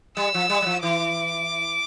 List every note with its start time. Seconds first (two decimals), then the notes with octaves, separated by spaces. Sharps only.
0.17 G3 E6
0.34 F3
0.50 G3
0.62 G3
0.66 F3
0.83 E3 D6